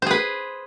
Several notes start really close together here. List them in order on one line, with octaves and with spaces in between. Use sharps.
C5 G#4 B4